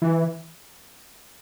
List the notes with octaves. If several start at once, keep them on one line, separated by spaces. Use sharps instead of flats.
E3